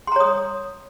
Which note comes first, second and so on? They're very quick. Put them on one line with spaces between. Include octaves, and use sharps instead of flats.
C6 A#5 C#5 D#6